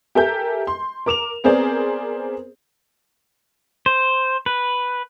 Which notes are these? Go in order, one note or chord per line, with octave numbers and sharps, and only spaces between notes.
G4 A4 A#4 E5 G#5 G6
C6
A#4 D6 E7 F7
B3 C4 G#4 A#4 C5 D5
C5
B4